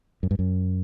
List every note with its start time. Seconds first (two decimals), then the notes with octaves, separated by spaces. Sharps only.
0.23 F#2
0.31 G2
0.39 F#2